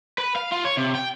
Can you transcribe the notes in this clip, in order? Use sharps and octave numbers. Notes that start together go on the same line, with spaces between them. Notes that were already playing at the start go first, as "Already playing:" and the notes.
B4
F5
F4
C#5
C3
G5